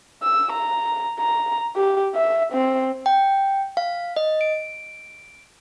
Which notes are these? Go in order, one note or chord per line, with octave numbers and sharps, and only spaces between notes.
E6
A#5
A#5
G4
E5
C4
G5
F5
D#5
D7